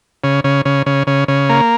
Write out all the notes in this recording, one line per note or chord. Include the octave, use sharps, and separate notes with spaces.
C#3
C#3
C#3
C#3
C#3
C#3
A#3